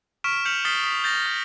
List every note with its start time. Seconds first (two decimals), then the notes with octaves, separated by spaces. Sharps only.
0.24 C#6 F6 B6 D7 E7
0.45 F6 G6 B6 C#7 F7 F#7
0.65 D#6 F6 A6 B6 C7 G7
0.84 D#6 B6
1.04 G6 A6 A#6
1.26 F6